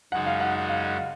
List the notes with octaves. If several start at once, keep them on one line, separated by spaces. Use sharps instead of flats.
F#2 C#3 G#3 D#4 F#4 F#5
F5
F#5
F#5
F5
F#5
F5